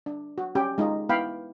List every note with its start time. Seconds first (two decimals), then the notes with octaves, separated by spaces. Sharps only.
0.06 D4
0.38 F#4
0.55 C#4 G4 G5
0.78 G#3 D#4 F4 D#5
1.09 B3 E4 F5 G5 B5